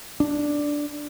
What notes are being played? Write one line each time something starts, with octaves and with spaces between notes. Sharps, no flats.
D4